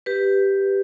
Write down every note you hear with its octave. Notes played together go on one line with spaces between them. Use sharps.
G4 B4